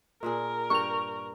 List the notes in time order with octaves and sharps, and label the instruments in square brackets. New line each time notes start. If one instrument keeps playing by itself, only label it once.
[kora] A#2 D4 G#4 [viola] A#4
[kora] G2 D4 G5 [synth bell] C#6 F7